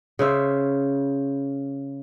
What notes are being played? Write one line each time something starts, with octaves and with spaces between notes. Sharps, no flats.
C#3 C5 E5